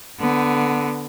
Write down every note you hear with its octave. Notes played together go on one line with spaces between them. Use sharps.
D3 B3